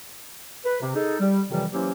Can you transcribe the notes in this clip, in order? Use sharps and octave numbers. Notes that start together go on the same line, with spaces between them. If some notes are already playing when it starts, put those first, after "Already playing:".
B4
C3
D#4 G#4 A4
G3
F2 C3 D#3 E3 F#3 G3
E3 F#3 A#3 C#4 G4 C5